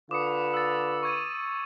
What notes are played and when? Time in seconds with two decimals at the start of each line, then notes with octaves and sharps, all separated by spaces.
0.11 D3 F4 B4 D6 D#6 C#7
0.54 E6 A6
1.03 C#6 G#6 D#7